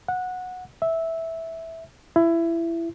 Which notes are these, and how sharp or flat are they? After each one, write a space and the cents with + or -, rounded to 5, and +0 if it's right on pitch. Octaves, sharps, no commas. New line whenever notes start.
F#5 -15
E5 -10
E4 +20